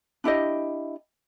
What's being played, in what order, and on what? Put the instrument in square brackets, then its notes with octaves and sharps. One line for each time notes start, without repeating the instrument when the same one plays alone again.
[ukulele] D4 E4 G4 D#5